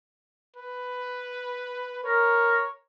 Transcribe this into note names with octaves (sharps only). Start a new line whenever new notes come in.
B4
A#4 C#5